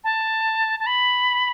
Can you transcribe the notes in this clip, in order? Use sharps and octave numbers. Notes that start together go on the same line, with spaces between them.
A5
A5
B5